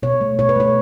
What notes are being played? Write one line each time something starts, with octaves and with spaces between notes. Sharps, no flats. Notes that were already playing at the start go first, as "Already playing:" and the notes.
B2 C#5
A3
B2 C#5
B4
A3 C#5